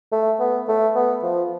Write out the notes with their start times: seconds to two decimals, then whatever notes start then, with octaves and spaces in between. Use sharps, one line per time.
0.12 A3
0.40 B3
0.68 A3
0.95 B3
1.23 F3